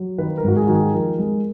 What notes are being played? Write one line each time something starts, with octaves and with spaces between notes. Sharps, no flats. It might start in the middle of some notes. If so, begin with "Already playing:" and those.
Already playing: F#3
D#3 B4
A#4
G#2 F#4
G#4
D#3 F#4
G#4
F3 A#4
G#3